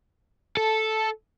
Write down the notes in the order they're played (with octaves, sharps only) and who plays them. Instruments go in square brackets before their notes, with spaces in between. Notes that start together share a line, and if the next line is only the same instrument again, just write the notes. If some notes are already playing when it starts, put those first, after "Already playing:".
[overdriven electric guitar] A4